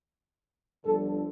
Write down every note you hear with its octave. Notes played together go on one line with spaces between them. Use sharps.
G1 G2 D3 F3 A4